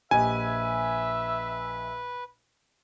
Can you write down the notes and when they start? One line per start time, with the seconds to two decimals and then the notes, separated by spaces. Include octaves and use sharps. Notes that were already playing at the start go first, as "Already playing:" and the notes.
0.11 A#1 G4 B4 D#5 E5 G#5